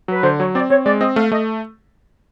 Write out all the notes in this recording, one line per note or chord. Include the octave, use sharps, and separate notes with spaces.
F#3 B4
D3 C5
F#3 C#5
C4 D5
C4 C#5
G#3 D5
C4 D#5
A3 F5
A3 D#5